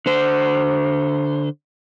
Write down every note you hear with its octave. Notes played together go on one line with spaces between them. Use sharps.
D3 C5